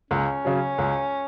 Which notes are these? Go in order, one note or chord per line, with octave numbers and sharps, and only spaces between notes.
C#2 C#4
C#3 F#3
C#2